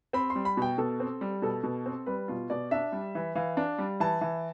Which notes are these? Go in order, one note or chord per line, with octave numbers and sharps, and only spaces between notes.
C4 B5
C6
G3
B5
B2 G5
B2 A4
C4
G3
B2 A4
B2
C4
G3 B4
B2 F4
B2 D5
D4 E5
G3
E3
E3 F5
D4
G3
E3 A5
E3